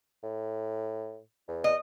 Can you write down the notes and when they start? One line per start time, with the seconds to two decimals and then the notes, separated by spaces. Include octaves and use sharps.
0.23 A2
1.48 E2
1.64 D#5